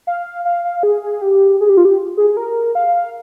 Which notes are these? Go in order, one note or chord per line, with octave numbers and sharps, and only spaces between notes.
F5
F5
F5
G#4
G#4
G4
G#4
G4
F4
G4
G#4
A#4
F5